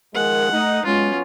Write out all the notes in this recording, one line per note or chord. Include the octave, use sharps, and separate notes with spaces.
D#3 F3 G#3 A#4 F#5
A3 D#4
F#3 G#3 B3 C#4 F4